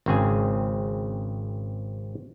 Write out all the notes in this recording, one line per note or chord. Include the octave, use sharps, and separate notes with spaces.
G#1 C#3 C4 G#4 G#5